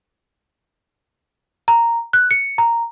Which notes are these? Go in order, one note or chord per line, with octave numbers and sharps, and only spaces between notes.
A#5
F#6
C#7
A#5